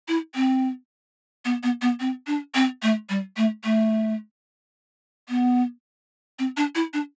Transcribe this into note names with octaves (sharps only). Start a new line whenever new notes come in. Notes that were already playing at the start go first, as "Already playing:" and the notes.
E4
C4
B3
B3
B3
C4
D4
C4
A3
G3
A3
A3
B3
C4
D4
E4
D4